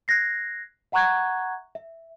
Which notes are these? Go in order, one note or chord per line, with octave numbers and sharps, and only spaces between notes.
F#6 G#6 A#6 C7
E5 F#5 A#5 C#6 F#6 G#6
E5